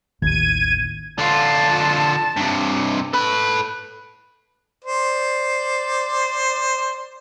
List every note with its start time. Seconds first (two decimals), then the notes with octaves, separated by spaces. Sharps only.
0.22 A1 D#2 D#3 G#6 D#7
1.18 D3 F4 A5
2.37 G2 C3
3.13 A4 B4 B5
4.84 C5 D5